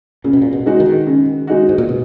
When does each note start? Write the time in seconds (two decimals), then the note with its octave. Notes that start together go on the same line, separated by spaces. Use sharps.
0.24 A#2 C#3
0.33 B2
0.42 A#2
0.53 B2
0.66 G#3 D#4 F#4
0.80 D#3
1.07 C#3
1.47 G#3 D#4 F#4
1.69 G#2
1.78 A#2
1.89 B2